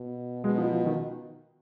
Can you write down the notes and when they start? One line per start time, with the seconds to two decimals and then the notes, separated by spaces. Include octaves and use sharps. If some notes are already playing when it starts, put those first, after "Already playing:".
Already playing: B2
0.44 B2 G#3
0.58 F3
0.72 F3
0.86 D#3